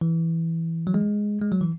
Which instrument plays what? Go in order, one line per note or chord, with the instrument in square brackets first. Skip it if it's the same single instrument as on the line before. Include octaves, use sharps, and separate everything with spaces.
[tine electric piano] E3
F#3
G#3
G#3
F#3
E3